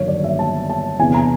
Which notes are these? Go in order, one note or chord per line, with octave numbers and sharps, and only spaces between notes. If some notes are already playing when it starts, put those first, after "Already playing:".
Already playing: G1 G2 D#3 F#3 C#5
D5
E5
A5
A5
E2 C3 E3 G#5
A#5